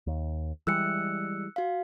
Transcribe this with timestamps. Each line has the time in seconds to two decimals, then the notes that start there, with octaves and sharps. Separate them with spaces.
0.07 D#2
0.67 E3 G3 G#3 E6 F#6 C#7
1.56 F#4 F5